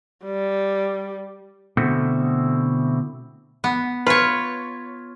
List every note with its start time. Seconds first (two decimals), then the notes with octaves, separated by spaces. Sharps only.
0.25 G3
1.77 B2 D3 A3 C4 E4 F#4
3.64 B3
4.07 F4 B4 C#5